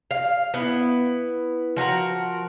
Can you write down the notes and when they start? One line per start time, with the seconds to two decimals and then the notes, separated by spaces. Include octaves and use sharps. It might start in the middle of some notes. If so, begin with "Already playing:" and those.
0.11 F5
0.54 B3 E4
1.77 F3 F#4 A4 A#4